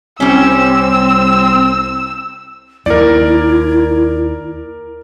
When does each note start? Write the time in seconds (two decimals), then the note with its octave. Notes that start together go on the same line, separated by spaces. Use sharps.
0.20 C2 G3 C4 C#4 E6
2.86 D#2 E4 A#4 D5